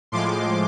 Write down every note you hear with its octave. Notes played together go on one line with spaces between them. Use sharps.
A2 F3 G#3 C6 D6